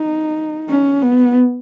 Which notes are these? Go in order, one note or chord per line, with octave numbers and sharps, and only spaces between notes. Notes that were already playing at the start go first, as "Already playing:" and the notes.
Already playing: D#4
C#4
B3